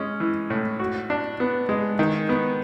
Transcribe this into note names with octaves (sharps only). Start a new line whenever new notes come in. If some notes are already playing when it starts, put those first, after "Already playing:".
Already playing: G#3 C#4
E3
A2
F#4
D4
B3
G#3
D#3
B3